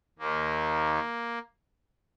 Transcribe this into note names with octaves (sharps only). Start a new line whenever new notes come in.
D#2 D#3 A#3